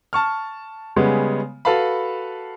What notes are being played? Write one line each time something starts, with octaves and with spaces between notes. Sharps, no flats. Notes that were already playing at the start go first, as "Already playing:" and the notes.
A5 C#6 F6
C#3 G3 G#3 B3
F#4 A4 B4 F5 A5 B5